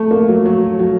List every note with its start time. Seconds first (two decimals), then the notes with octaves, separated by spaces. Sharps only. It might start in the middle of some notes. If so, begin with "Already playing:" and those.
Already playing: A3
0.11 A#3
0.28 F#3
0.46 F#3
0.79 F#3